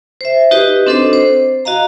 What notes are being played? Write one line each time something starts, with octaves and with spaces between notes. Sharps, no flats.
C5 E5
D#4 F#4 G4 B4 D#5
C4 D4 A4 C5 D#5
C5
F#4 D#5 F5 A#5